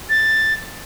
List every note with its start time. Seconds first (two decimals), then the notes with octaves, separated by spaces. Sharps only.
0.10 A6